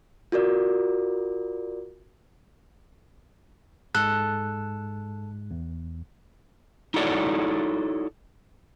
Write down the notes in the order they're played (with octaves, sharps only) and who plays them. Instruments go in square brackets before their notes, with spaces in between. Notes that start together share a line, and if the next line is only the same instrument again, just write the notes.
[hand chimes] F4 F#4 A#4 D5
[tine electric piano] G#2 G#3 [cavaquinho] A4 [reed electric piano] F#6
[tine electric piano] E2
[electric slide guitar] D#4 E4 F#4 A4 C#5 D5